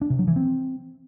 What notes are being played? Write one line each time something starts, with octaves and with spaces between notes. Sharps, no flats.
D4
C3
F#3
E3
C4